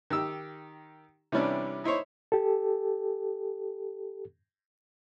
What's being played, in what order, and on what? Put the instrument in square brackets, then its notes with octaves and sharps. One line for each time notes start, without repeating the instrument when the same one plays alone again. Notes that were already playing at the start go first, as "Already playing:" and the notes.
[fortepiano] D#3 G4 E6
C3 E3 G3 C#4 D4
D#4 E4 C5 C#5
[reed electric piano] G4 A4